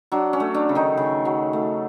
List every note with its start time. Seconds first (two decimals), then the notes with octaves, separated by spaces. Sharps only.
0.12 F#3 D4
0.33 C#4
0.40 A3
0.54 D4
0.69 C#3
0.75 D#3 D#4
0.97 C#3
1.25 F#3
1.53 A3